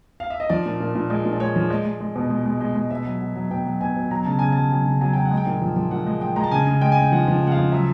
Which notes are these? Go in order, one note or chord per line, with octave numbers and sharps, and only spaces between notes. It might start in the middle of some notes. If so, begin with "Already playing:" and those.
F5
E5
D#5
F3 D5
A#2
A#2
A#2
G#3 D5
A#2
D5
G#3 C#5
F3
G#3 D5
G#3
G#3
B2
G#3
G#3
G#3
G#3
B2 E5
F#3
F#3
F#3
B2 G5
F#3
B2 G#5
B2
F#3 A#5
C#3 A5
C#3 G#5
F#3 A5
F#3 G#5
C#3
F#3 G#5
F#3 G5
F#5
G#3
G5
A#2
F3
F3
A#2 F#5
G#3
G#3 G5
G#3 A#5
A5
C#3 G#5
C#3
G#3 G5
G#5
C#3 G5
F3 F#5
F3
C#3
F#5
F5
F3
F#3 E5